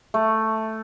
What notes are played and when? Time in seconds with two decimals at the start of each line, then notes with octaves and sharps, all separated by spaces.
0.14 A3